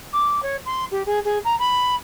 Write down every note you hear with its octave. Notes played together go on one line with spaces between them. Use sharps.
D6
C#5
C6
G4
G#4
G#4
A#5
B5